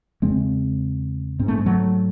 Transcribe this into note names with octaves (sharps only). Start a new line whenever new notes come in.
E2 C#3 G#3 C4
G#2 C4
A3
G#3
F#3 A3